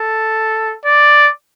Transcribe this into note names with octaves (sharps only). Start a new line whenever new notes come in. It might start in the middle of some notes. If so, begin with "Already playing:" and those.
Already playing: A4
D5